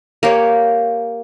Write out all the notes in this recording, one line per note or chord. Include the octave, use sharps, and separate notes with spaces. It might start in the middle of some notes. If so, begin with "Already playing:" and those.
A#3 G4 C#5